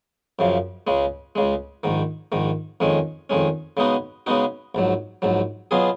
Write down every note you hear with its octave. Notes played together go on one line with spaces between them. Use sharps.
F#2 C#3 F3
C#2 C#3 G#3
C#2 C#3 G#3
A#1 G#2 D#3
A#1 G#2 D#3
F2 D#3 G#3 C#4
F2 D#3 G#3 C#4
C#3 G#3 B3 D#4 F#4
C#3 G#3 B3 D#4 F#4
A#1 G#2 F#3
A#1 G#2 F#3
B2 F#3 B3 F4 G#4